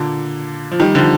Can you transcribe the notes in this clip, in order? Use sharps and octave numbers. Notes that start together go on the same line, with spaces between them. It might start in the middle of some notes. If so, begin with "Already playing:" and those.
Already playing: A#2 D3
F3
D#3 G3
D3 F3